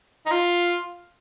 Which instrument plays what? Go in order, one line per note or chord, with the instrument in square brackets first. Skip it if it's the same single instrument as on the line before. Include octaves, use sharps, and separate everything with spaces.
[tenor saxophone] D#4
F4